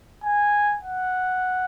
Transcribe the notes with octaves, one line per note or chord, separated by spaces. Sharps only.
G#5
F#5